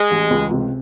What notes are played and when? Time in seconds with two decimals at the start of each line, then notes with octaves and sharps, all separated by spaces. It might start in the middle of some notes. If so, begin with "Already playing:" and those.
Already playing: G#3
0.11 A1
0.31 C#2
0.51 C3